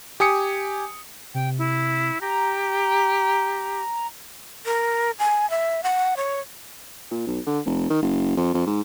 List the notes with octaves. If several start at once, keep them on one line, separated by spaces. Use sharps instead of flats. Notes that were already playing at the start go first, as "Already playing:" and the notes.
G4 G#5 D#6 C#7
C3 G5
E4
G4 A#5
A#4
G#5
E5
F#5
C#5
A#2
B1
D3
F1
D#3
F#1
F2
F2
G#2